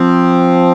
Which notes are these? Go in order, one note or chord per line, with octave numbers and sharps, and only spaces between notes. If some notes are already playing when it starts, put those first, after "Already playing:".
Already playing: F3 C4